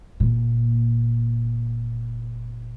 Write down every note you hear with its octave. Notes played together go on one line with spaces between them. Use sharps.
F#1 A#2